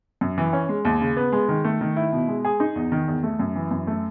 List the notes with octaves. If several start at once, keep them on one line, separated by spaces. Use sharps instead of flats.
F#2
E3
C#4
G#3
D#2
C#3
B3
G#3
D#3
A3
D#3
E4
B2
G#3
G#4
D#4
E2
D#3
E2
A3
F#2
E3
F#2
A3